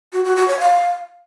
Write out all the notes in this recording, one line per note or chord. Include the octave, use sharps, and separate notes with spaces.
F#4
F#4
F#4
C#5
F5